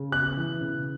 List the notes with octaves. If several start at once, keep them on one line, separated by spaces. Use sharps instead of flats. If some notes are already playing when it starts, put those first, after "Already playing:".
Already playing: C#3
B3 F#6
E3
C#3